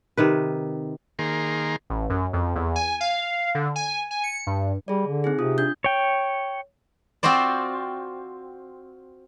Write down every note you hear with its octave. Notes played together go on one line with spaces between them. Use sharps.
C3 D#3 B4
D#3 A#3 G#4 A#5 C6
A1
F#2
F2
E2
G#5
F5
D3
G#5
G#5
C#7
G2
G3 G#4 D5
D3
C4 D#4 G#4
C3 F4 D#6
D4 G6
C#5 G5
C4 F4 F#4 C5 D5